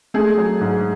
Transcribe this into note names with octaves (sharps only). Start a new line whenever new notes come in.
A3 G#4
F#3
G#2